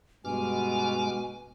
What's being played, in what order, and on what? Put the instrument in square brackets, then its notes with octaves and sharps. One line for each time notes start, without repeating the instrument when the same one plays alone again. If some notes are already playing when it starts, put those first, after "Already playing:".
[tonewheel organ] G2 D6 F6 [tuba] B2 [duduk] G#3 [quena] G#5